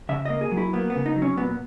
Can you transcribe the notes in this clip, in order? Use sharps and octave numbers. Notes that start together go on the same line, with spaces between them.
C#3 E5
A#3 D#5
G#4
F#3
E4
A#3 B3
B3
C#3
D#4
F#3
C#4
A#2 B3